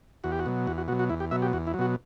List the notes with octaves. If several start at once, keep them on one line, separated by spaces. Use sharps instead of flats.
E2 F#4
G4
F#4
B2 F#3
E2 F#4
F#4
B2 F#3 F#4
F#4
E2 E4
G4
B2 F#3 E5
G4
E2 F#4
E4
F#3
B2 F#4